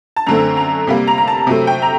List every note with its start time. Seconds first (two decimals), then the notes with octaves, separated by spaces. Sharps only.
0.16 A5
0.26 F#2 D3 A3 C4 A#5
0.57 A#5
0.87 C3 G3 A#3
1.08 A#5
1.18 A#5
1.28 A5
1.47 C3 F#3 A3 C4
1.67 G5
1.82 A#5